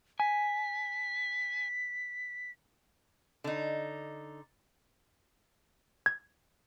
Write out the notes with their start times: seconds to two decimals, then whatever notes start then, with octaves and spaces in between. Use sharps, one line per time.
0.20 G#5 B6
3.44 D3 D#4
6.06 G#6